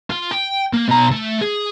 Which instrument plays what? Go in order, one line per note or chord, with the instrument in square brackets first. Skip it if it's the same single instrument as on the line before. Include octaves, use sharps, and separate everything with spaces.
[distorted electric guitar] F4
G5
A#3
B2 A#5
A3
G#4